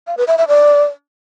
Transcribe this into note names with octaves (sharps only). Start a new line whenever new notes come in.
F5
B4
E5
E5
D5